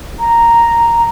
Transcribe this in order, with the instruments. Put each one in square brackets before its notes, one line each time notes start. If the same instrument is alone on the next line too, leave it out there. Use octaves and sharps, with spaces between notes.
[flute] A#5